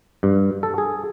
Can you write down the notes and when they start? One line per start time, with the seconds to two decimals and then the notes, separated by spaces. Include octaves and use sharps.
0.23 G2
0.63 A4
0.78 G#4